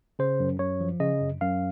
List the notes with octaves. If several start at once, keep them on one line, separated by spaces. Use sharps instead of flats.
C#3 C5
F#2
F#2 C#5
F3
C#3 D#5
F#2
F#2 F5